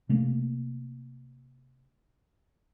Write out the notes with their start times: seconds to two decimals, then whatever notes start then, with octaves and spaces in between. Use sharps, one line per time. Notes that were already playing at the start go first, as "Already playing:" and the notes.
0.09 C3 A3 A#3